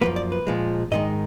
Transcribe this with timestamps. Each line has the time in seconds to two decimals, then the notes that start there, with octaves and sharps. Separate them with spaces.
0.01 F#2 F3 A#3 B4
0.16 D5
0.32 B4
0.47 A#2 F3 G#3
0.91 G#2 D#3 G#3 D#5